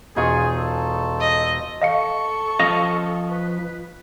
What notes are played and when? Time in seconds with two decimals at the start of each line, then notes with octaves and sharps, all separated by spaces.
0.16 E1 D#4 F4 G#4 C#6
0.58 A4
1.20 D#5
1.82 A4 D#5 F5 C#6 C#7
2.60 F3 D#5 F5 A#6
3.29 B4